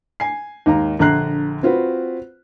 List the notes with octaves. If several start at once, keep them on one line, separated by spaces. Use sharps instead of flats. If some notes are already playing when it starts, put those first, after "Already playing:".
G#5 C7
D#2 G#2 F5 A#5
A#1 D3 A#5 F#6 C7
C4 F4 F#4 B4